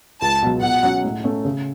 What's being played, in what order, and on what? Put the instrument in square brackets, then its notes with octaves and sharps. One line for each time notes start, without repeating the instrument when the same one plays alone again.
[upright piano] C#2 [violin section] A5
[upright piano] B2 F#3
[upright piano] B2 [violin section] F#5
[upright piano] F#3 C#4
A2
A3 C#4
C#3